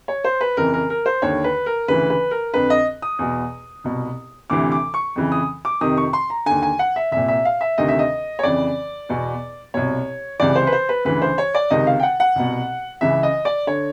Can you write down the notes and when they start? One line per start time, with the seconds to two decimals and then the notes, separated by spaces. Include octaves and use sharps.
0.08 C#5
0.24 C5
0.41 B4
0.57 F2 C#3 E3 A#4
0.74 A#4
0.90 A#4
1.06 C5
1.22 D#2 D3 C#5
1.44 B4
1.66 A#4
1.88 D2 C#3 E3 B4
2.10 B4
2.31 A#4
2.54 F2 D3 B4
2.70 D#5
3.02 D#6
3.19 E2 B2
3.84 C2 B2
4.50 D2 C3 E3 D6
4.72 D6
4.94 C#6
5.16 F2 C#3 E3
5.32 D#6
5.65 D6
5.81 F2 C3 D#3 D#6
5.97 C#6
6.13 C6
6.30 A#5
6.46 D#2 D3 G#5
6.63 G#5
6.79 F#5
6.96 E5
7.12 C2 A#2 E5
7.28 E5
7.45 F5
7.61 E5
7.78 D2 C3 D#3 D#5
7.89 E5
7.99 D#5
8.39 C#5
8.43 F2 C#3 E3 D5
9.09 E2 B2
9.74 C2 B2 C#5
10.39 C#2 C3 E3 D5
10.56 C5
10.67 B4
10.72 C5
10.89 B4
11.05 D2 C#3 E3 B4
11.22 C5
11.38 C#5
11.55 D5
11.70 C#2 C3 D#3 D#5
11.87 F5
12.00 G5
12.03 F#5
12.20 F#5
12.36 C2 B2
13.01 C#2 C#3 E3 E5
13.23 D#5
13.45 D5
13.67 D3 C#5